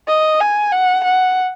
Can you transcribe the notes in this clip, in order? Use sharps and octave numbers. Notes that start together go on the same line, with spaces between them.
D#5
G#5
F#5
F#5